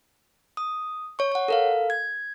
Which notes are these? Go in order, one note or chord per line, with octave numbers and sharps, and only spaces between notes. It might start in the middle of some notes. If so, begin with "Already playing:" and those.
D#6
C#5 C#6
C#5 F#5
A4 A#4 F5
G#6